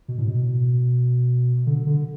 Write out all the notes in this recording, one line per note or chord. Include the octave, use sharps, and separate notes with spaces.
B2
A2
B2
D3
D3